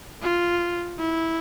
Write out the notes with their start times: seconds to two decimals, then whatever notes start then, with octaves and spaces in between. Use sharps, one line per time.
0.22 F4
0.99 E4